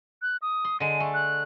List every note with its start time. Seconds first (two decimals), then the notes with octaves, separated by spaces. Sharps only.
0.22 F#6
0.42 D#6
0.65 C6
0.80 D3 G#3 D#7
1.00 A3
1.14 F#6